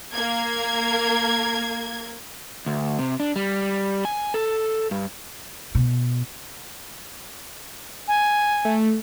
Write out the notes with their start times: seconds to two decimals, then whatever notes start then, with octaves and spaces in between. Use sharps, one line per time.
0.13 A#3 G#6
2.66 D2
2.99 C3
3.20 D4
3.36 G3
4.05 G#5
4.34 A4
4.91 G2
5.75 B2
8.08 G#5
8.65 A3